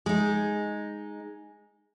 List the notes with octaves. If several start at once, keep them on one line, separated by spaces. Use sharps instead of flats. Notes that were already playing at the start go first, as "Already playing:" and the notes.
G#3 D#4